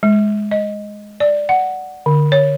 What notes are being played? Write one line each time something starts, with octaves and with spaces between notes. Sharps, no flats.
G#3
D#5
D5
F#5
D3
C#5